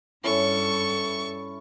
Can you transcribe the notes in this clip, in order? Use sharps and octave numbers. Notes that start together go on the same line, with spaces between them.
G2 C#4 E4 A4 C#6